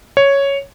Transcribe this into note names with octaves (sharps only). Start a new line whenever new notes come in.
C#5